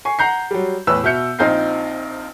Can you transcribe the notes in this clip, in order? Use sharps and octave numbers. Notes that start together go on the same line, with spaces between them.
G#5 C#6 C7
F#5 A#5 G6 C7
F#3 G3
E2 A2 B4 E6
B2 E5 F6 G6 C#7
A#1 C4 D#4 F4 G6 C7